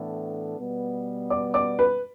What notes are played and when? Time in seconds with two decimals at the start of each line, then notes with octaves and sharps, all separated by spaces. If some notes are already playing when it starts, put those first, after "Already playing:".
Already playing: A2 E3 B3 D4 A4
0.58 B2 G3 B3
1.30 D5 D6
1.54 D5 D6
1.79 B4 B5